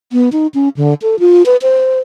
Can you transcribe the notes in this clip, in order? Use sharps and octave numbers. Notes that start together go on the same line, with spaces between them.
B3
D#4
C#4
D3
A4
F4
B4
C5